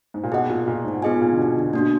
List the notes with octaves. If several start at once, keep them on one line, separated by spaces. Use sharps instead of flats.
G#2
A#2
B2 G#4 D#5 F#5
A#2
A#2
G#2
A#2 B3 F4 G#4 D#5 G#5
A#2
D3
B2
D3
B2 A#3 D4 F#4